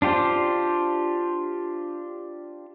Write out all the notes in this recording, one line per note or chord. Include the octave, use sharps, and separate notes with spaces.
D4 F4 G4 C5